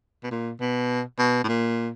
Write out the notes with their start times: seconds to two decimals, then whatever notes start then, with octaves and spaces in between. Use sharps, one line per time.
0.24 B2
0.31 A#2
0.60 B2
1.19 B2
1.44 A2
1.48 A#2